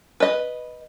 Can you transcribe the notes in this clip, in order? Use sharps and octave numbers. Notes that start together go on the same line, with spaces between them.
B4 D#5